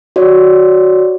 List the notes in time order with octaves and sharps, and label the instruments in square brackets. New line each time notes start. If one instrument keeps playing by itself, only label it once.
[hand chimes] F#4 C#5 D5